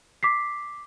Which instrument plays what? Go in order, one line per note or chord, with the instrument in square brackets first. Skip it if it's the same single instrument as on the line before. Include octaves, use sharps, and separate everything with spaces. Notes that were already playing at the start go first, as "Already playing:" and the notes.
[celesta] D6 B6 C7